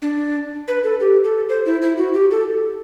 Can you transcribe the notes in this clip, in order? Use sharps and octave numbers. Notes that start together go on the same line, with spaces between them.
D4
B4
A4
G4
A4
C5
E4
E4
F#4
G4
A4